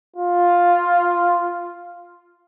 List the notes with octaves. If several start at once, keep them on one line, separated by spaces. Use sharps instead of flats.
F4